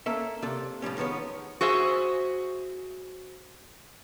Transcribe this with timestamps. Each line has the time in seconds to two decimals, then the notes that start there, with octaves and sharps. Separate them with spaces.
0.06 A#3 C#4 A4 E5
0.42 C3 A#3 D4 A4
0.82 A2 F3 G3 C#4
0.97 D#3 F3 G#3 B3 C#5
1.61 F#4 G#4 C5 E5